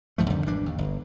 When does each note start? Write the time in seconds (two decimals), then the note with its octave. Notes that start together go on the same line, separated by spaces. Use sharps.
0.18 C2 G#2 F3 A3
0.30 F2 D3 D#3 G3
0.46 G#1 E3 G3 D4
0.66 D#2
0.78 G1